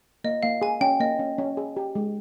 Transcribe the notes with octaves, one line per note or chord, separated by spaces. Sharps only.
A#3 D#5
A#3 F5
G#4 G#5
C#4 G5
A#3 D#5
C#4
C#4
G#4
G4
G#3